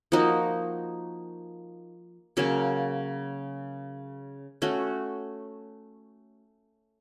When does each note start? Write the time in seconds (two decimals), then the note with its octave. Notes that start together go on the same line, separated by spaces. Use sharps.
0.12 F3 A#3 D#4 F#4
2.37 C#3 F#3 A#3 C#4
4.62 A3 C#4 F#4